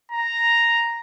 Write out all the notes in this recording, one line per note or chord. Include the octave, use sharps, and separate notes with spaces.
A#5